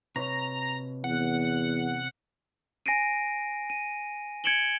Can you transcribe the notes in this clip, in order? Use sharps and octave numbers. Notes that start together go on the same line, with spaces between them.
C3 B4 C#5 A#5
E2 F#5
G#5 A#6 C7 D7 D#7
D#7
G#6 C#7 D7 E7 F#7 G7